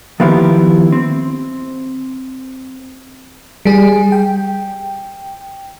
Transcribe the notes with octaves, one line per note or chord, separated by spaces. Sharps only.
D#3 F3 B3 E4 F4 G4
C4
G3 G#4
G5